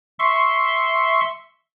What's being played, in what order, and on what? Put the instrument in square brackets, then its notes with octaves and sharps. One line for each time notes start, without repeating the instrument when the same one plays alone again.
[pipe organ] E5 C6 C#6